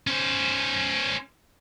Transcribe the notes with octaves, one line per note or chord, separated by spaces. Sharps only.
C#4 C5